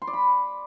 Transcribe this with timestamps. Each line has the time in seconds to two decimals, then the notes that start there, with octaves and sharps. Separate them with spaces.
0.02 C6
0.07 D5
0.13 B5